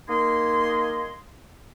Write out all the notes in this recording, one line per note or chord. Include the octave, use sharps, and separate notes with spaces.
A#3 D#4 G#4 D#5 C6